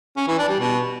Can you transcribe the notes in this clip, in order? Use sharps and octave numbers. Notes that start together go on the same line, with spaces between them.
C#4
E3
D4
G3
B2